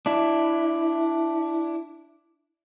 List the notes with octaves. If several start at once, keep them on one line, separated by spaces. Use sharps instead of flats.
D4 E4